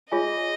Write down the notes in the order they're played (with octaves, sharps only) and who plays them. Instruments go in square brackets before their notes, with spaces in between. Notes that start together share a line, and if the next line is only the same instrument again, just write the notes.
[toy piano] F4 G#4 C#5 E5 G#5 [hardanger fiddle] D#5